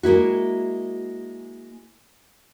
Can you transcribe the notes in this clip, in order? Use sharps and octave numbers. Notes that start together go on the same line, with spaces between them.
G#3 A#3 E4 F#4